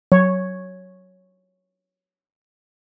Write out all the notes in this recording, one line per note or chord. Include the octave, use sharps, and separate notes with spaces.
F#3 C#5